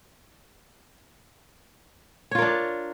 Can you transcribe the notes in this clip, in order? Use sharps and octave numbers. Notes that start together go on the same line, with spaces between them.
D4 F4 A#4 C#5